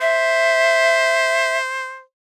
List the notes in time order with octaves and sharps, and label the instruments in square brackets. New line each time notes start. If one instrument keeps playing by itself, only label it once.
[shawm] C5 [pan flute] E5